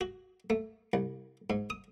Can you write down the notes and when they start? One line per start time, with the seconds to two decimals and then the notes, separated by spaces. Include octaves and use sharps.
0.01 F#4
0.50 A3
0.93 C2
1.50 G#2
1.70 D#6